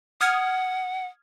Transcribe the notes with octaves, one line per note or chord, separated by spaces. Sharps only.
F#5 D#6 F6 G#6